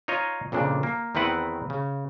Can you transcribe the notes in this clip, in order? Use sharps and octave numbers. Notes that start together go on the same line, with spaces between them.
D#4 F4 C#5 D#5
F2 A#2 C#3 D4
A#3
E2 D#3 C4 E4 B4 F#5
C#3